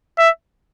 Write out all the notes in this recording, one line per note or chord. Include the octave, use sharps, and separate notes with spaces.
E5